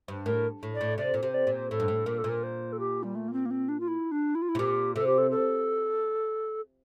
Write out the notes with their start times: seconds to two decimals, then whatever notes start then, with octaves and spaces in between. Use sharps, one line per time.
0.08 G2
0.26 A2 A#4
0.63 A2
0.74 D5
0.81 A2
0.98 C3 D5
1.14 A#2
1.23 C3 C5
1.34 D5
1.47 A#2
1.53 C5
1.70 A2 A4
1.80 G2
1.88 A2
2.06 A#2 A#4
2.18 A4
2.24 A#2
2.29 A#4
2.43 C5
2.72 A4
2.79 G4
3.03 G3
3.15 A3
3.28 A#3
3.33 C4
3.45 A#3
3.50 C4
3.68 D4
3.80 F4
3.88 E4
4.11 D4
4.35 E4
4.42 F4
4.49 E4
4.55 C3
4.59 A#2 G4
4.95 C3 A4
5.07 G4
5.18 A4
5.31 A4